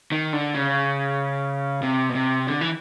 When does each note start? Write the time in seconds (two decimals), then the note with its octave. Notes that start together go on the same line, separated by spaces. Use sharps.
0.12 D#3
0.33 D3
0.55 C#3
1.83 C3
2.09 B2
2.15 C3
2.47 D3
2.61 E3